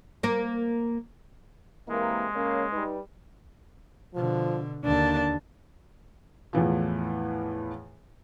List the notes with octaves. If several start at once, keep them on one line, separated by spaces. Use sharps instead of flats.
A#3 A#4
C3 E3 G#3 A#3
C#3 A#3 C#4
G3 D#4 B4
B2 D3 F3
D#2 D3 A#3 D4 A5
E2 A2 E3 F3